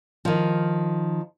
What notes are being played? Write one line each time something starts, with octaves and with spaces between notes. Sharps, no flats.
D#3 F3